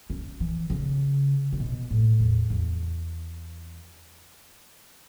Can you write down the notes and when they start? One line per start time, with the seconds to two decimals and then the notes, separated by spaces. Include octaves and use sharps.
0.10 C#4
0.40 E3
0.70 C#3
1.53 C#3
1.60 B2
1.90 A2
2.20 E2
2.50 E2